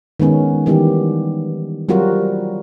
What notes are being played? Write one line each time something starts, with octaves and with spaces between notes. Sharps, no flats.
D#3 G#3 B3 C#4
D#3 E3 G3 B3 G4
F#3 G3 C4 F4 F#4 A#4